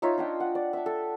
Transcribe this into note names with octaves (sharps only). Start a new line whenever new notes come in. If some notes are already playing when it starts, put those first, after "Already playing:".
D#4 F4 C#5 E5
D4 D#5 G5
F#5
D5
E5 A5
A4